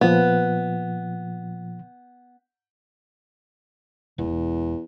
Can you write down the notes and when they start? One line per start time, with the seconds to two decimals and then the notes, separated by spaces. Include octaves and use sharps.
0.01 A#2 F3 B3
4.18 E1 E2